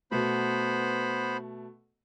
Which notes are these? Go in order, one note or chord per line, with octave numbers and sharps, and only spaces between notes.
B2 A3 B3 C5 B5